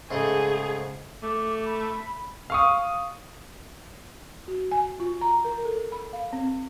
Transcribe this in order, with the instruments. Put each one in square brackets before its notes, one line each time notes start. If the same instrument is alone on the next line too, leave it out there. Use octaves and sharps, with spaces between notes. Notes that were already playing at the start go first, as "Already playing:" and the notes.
[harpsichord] G#2 C#3 A3 [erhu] G#4
[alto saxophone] A3 [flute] D6
[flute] B5
[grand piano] F5 C#6 D#6
[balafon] F#4
G#5
F4
A#5
A#4
A4
B5
F5
C4